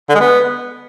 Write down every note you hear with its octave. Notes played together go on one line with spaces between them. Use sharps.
D3
G#3
B3